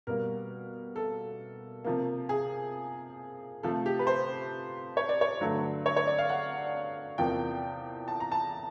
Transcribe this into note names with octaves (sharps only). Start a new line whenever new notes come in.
B2 G3 A#3 A#4
A4
C3 F3 A#3
G#4
C3 F3 A3 A4
G4
B4
C5
C#5
D5
C#5
G2 D3 F#3 A3
C#5
C#5
D5
F5
F#5
E2 C3 F3 A#3 G5
A5
A#5
A5